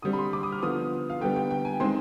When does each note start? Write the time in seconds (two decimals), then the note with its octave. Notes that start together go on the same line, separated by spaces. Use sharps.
0.02 D3 G3 C4 D#6
0.13 B5
0.18 C6
0.33 D6
0.43 D#6
0.52 F6
0.62 D3 F3 B3 D#6
1.10 F5
1.21 D3 G3 B3 G5
1.36 G5
1.51 G5
1.65 G#5
1.80 D#3 G#3 C4 C6